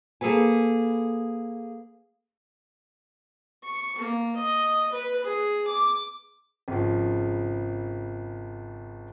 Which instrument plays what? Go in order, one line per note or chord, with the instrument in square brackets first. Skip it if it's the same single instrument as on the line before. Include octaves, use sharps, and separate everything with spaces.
[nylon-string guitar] A#3 G#4 A4 B4 G#5
[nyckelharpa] C#6
A#3
D#5
B4
G#4
D6
[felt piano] G#1 C#3 F3